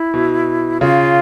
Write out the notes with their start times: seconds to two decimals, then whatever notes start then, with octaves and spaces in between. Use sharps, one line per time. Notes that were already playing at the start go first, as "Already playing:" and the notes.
Already playing: E4
0.14 B2
0.81 C#3 F4